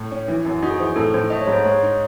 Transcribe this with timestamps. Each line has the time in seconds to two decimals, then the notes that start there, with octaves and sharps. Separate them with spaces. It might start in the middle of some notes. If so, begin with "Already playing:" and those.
Already playing: A2
0.11 C#4
0.28 E3
0.45 F#2
0.62 D#4 F#4
0.71 G#4
0.80 E3 C5
0.96 A2 A4
1.14 A2 C5
1.30 A3 D#5
1.41 C#5
1.47 G#2
1.53 C5
1.64 G#3 C#5
1.82 D#4